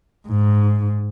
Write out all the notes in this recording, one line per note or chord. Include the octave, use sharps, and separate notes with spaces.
G#2